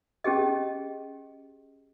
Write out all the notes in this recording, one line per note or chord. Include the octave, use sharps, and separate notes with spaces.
C#4 G4 G#4 D#5